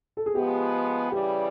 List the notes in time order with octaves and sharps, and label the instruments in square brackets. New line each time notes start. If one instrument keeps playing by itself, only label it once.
[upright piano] A4
G#4
[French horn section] F3 G#3 B3 [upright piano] G4
[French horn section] C#3 E3 G3 [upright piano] G4